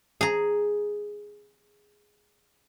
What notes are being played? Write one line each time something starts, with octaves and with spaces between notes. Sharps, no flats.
G#4 A#5